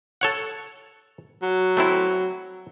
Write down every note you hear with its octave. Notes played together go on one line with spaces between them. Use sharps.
A4 C#5 F#5
F#3
A3 C4 E4